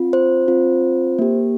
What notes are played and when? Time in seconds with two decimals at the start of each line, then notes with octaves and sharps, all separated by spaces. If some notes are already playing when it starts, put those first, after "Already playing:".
Already playing: C4 F4
0.13 C5
0.48 C4 F4
1.19 A#3 G4